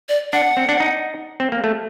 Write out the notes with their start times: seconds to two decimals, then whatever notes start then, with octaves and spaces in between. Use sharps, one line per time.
0.09 D5
0.33 D4 F#5
0.57 C4
0.69 D4
0.80 D#4
1.40 C4
1.52 A#3
1.64 A3